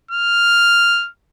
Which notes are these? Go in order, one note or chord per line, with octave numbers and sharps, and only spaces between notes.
F6